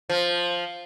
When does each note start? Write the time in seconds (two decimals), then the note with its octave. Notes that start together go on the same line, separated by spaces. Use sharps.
0.10 F3